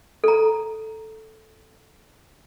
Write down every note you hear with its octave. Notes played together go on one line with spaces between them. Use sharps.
A4 A#5